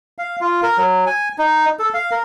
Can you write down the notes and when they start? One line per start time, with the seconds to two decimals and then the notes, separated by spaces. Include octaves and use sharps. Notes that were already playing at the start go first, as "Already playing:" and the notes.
0.18 F5
0.41 F4
0.63 A#4
0.78 F#3
1.06 G#5
1.38 D#4
1.79 A4
1.94 F5
2.11 A#4